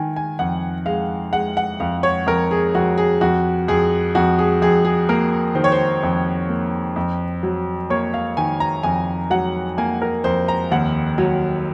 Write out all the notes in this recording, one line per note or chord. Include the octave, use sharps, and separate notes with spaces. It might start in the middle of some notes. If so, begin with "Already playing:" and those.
Already playing: D#3 G#5
G#5
F2 F#5
G#3 F5
G#3 F#5
F#5
F2 F5
C#5
F2 A#4
G#4
F2 F#4
G#4
F2 F#4
F2 G#4
F2 F#4
G#4
F2 G#4
G#4
A#3 A#4
D#3 C5
C#5
C5
F2
A#3
F2
F#3
A#3 C#5
F5
D#3 G#5
A#5
F2 G#5
F#3 F#5
A#3 G#5
A#4
F2 C5
A#5
D#2 F#5
F#3